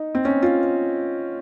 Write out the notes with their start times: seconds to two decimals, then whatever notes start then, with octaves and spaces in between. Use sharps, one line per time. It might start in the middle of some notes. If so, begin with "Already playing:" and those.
Already playing: D#4
0.15 C4
0.25 C#4
0.42 F4